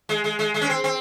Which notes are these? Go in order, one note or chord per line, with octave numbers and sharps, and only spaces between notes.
G#3
G#3
G#3
G#3
C#4
C4
C4